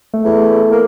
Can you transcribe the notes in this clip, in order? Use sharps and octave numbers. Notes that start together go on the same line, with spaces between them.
A3
E2
A#3